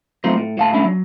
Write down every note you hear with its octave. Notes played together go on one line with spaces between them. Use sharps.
F#3 A3 C4 D#4 F4 C5
A2
A2 F5 A5
A3 C#4 D4 E4
F#3